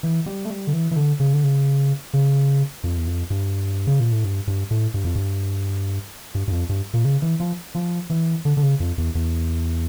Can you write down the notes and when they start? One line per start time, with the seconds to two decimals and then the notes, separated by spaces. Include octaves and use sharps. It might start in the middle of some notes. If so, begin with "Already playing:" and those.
0.03 E3
0.26 G3
0.45 A3
0.50 G3
0.67 D3
0.73 E3
0.91 E3
0.96 D3
1.20 C#3
1.33 D3
1.43 C#3
2.14 C#3
2.84 F2
2.97 E2
3.07 F2
3.30 G2
3.87 C#3
4.00 A#2
4.12 A2
4.24 G2
4.47 G2
4.71 A2
4.94 G2
5.04 F2
5.15 G2
6.35 G2
6.48 G2
6.52 F2
6.69 G2
6.94 A#2
7.05 C#3
7.22 E3
7.40 F3
7.75 F3
8.10 E3
8.45 D3
8.57 D3
8.62 C#3
8.80 F2
8.98 E2
9.15 E2